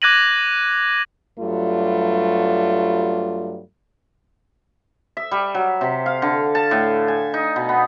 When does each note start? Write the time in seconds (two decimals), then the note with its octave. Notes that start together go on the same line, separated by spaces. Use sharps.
0.02 D6 F#6 G#6 A#6 D#7 F#7
1.39 G2 F#3 G3 A3 F4
5.17 E5
5.31 G3
5.55 F#3
5.81 C3
6.06 F5
6.22 D3
6.55 A5
6.71 A2
7.08 G#5
7.34 D#4
7.56 B2
7.69 B3